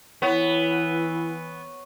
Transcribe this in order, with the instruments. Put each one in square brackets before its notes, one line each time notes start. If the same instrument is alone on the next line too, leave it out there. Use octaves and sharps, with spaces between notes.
[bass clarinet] E3 [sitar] B3 [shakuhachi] E4 [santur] C#5